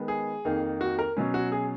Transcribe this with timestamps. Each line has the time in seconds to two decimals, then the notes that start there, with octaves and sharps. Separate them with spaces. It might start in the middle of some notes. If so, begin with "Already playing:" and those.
Already playing: D#3 G#3 B3
0.08 G#4
0.45 F2 D#3 A#3 D#4
0.81 F#4
0.99 A#4
1.17 B2 F#3 C#4
1.34 F#4
1.52 G#4